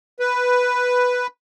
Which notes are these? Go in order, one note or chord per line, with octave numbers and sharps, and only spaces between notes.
B4